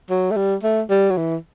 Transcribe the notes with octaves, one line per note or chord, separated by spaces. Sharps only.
F#3
A3
G3
A3
G3
F#3
E3